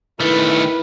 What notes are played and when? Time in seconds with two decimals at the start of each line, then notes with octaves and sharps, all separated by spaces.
0.20 D#3 A3 E4 B4